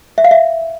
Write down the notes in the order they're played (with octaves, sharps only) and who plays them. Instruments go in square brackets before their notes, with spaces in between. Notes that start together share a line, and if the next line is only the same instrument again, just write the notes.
[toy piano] E5
F5
E5